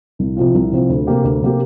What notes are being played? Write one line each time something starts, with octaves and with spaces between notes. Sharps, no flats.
C2
C3 F3 C4 F4
C2
C3 F3 C4 F4
D2
C3 A#3 G4
D2
C3 A#3 G4